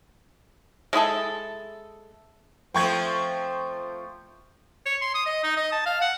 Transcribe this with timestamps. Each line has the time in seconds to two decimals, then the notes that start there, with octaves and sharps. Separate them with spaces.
0.93 G#3 E4 G#4 A4
2.74 F3 A3 C4 C5 G5 C#6 G#6
4.86 C#5
5.02 C6
5.14 D#6
5.26 D#5
5.43 D#4
5.57 D#5
5.72 A5
5.86 F5
6.02 F#5